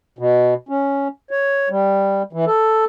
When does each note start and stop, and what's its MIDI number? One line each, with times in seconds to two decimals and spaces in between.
0.19 0.54 47
0.69 1.08 61
1.31 1.69 73
1.70 2.22 55
2.33 2.45 52
2.47 2.85 69